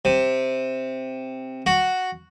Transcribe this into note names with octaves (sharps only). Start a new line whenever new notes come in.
C3
F#4